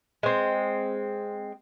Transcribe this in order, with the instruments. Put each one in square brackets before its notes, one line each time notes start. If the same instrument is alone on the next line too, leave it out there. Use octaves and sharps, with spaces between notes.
[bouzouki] G#3 C4